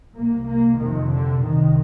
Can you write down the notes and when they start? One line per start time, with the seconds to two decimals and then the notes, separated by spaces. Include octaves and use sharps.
0.13 C2 C3 A#3
0.45 A#3
0.77 F2 C3 D#3
1.10 D3
1.42 C2 C3 D#3